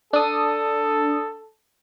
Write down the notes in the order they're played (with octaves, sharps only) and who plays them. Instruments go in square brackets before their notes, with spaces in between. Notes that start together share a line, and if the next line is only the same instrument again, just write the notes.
[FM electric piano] D4 D#6 [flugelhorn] A4